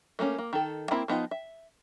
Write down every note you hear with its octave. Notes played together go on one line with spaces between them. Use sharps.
A3 A#3 C4 C#4
A#3
D#3 A4
A#3 C4 E4 B5
F3 B3 D#4 F4
E5